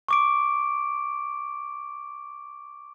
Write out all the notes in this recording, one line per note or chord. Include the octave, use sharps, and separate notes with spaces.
C#6 D6 D7